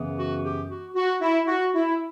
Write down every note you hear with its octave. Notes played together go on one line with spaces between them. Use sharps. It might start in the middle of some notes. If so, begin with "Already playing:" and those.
Already playing: F#2 C#3 E3 B3
F#4
G4
F#4
F#4
E4
F#4
E4